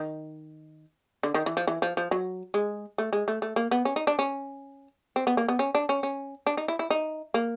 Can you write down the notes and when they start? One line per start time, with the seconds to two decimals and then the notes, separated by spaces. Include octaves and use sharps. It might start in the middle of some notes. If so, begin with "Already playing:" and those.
Already playing: D#3
1.23 D3
1.34 D#3
1.46 E3
1.57 F3
1.67 E3
1.82 F3
1.97 F3
2.11 F#3
2.54 G#3
2.98 A3
3.13 G#3
3.28 A3
3.42 A3
3.56 A#3
3.71 B3
3.85 C#4
3.96 D#4
4.07 D4
4.19 C#4
5.16 C4
5.27 B3
5.37 A#3
5.49 B3
5.59 C#4
5.75 D4
5.89 C#4
6.03 C#4
6.47 D4
6.57 D#4
6.68 E4
6.79 E4
6.90 D#4
7.34 A#3